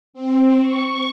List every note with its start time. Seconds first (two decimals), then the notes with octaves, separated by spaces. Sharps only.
0.14 C4
0.60 C#6